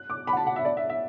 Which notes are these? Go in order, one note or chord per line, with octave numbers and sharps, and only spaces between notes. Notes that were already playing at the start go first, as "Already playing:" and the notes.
Already playing: F#6
D6
B5
F#5
A5
F#5
E5
D5
E5
E5